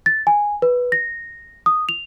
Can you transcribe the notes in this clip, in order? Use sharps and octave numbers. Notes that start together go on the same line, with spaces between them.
A6
G#5
B4
A#6
D#6
F7